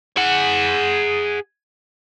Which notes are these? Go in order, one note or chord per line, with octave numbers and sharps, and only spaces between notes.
G#4 F#5